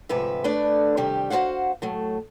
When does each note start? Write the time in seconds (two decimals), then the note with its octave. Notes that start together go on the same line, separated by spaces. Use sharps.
0.09 D2 G#2 C3 F3 B4 E5
0.44 A3 D4 B4 D5
0.97 C3 D#3 G3 G4
1.30 F#4 G#4 C5 F5 F#5
1.82 A2 F#3 A3